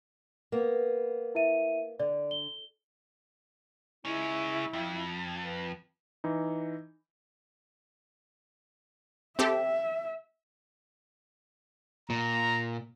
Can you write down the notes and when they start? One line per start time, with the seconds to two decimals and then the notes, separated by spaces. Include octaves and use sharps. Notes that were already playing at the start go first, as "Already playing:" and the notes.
0.52 A#3 B3
1.35 E4 E5 D#7
2.00 D3 D5
2.31 G7
4.05 G#3 C#4 E4
4.73 F2
5.43 B4
6.24 E3 D#4
9.39 C4 G4 A4 E5
12.10 A#2 A#5